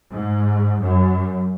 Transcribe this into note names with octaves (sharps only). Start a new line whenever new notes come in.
G#2
F#2